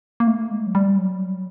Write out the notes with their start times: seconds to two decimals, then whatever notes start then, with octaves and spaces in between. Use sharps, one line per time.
0.20 A#3
0.27 A3
0.51 G#3
0.67 F#3
0.75 G3
0.98 F#3